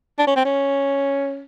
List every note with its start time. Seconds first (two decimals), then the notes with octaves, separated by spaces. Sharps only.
0.19 D4
0.27 C#4
0.36 C4
0.45 C#4